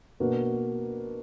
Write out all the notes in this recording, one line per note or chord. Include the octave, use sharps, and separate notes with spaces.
B2 A#3 D4 F#4 B4